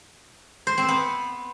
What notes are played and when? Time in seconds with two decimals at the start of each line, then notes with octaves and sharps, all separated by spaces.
0.67 C5
0.78 C4
0.88 B3